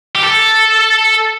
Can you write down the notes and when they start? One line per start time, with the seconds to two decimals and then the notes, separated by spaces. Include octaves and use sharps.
0.15 G4
0.22 A4